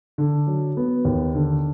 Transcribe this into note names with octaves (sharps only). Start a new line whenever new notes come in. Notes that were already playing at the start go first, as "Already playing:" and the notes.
D3
F#3
B3
D#2
D3